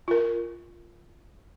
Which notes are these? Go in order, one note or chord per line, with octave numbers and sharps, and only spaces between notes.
F4 A#4